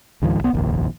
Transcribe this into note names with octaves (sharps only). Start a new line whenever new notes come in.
C#2 G#2 D#3 F3
B1 B3
F1 A#1 D#2